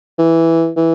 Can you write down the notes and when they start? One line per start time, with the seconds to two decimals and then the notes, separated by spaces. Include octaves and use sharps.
0.18 E3
0.77 E3